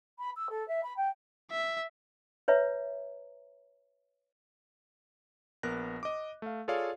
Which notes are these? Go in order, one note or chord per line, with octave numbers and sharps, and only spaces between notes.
B5
E6
A4
E5
B5
G5
E5
B4 C#5 E5 A#5
A#1 B3 A#4 F#6 A#6
D#5 D6
A3 F5
F4 G#4 A4 C#5 D5 F5